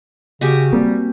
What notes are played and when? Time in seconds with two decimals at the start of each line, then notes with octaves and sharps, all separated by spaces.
0.41 C#3 F#4 G4 G#5
0.73 G3 A#3 C4